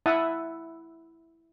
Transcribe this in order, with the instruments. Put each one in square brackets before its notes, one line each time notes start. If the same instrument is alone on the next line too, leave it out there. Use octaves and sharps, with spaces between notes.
[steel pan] E4 E5 F#5 A5 D#6